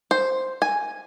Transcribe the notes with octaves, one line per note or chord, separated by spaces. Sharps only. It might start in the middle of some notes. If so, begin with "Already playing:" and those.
C5
G#5